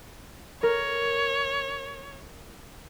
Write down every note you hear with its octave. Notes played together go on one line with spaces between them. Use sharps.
A#4 C#5